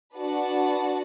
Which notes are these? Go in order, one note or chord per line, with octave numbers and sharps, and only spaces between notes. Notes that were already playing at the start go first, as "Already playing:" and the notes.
D4 F#4 B4 F#5 A5